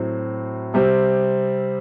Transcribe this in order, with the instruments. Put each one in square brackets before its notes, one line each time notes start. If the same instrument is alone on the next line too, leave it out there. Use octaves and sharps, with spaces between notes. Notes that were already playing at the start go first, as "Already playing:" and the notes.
Already playing: [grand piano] A2 F#3 C4 F#4
C3 G3 C4